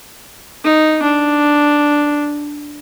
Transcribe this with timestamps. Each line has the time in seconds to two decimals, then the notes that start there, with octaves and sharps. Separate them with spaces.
0.64 D#4
1.02 D4